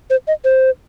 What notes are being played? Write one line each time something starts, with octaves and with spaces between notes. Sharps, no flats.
C5
D#5
C5